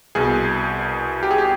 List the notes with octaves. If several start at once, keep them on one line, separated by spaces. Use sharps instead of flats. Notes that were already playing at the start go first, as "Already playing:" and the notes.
C2 B2 G#4
G4
G#4
G4